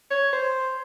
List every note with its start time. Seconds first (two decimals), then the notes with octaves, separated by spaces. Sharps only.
0.10 C#5
0.33 C5